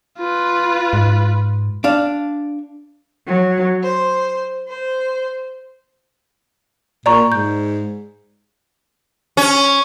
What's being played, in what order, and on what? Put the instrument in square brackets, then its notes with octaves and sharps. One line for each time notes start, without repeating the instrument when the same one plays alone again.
[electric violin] F4 B4
[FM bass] G#2
[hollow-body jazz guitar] D4 F5
[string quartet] F#3
C5
C5
[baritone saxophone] A#2 [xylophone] D5 A#5 C#6
[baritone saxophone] G#2 [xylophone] G6
[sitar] C#4